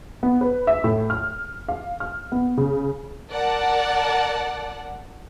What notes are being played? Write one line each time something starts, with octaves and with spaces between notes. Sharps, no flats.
B3
B4
E5
A2
F6
F5
F6
B3
C#3
A#4 D5 F#5 A5